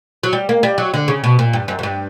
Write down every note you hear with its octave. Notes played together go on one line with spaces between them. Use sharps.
F#3
G3
A#3
G3
F#3
D3
C#3
B2
A#2
G2
F#2
F#2
G2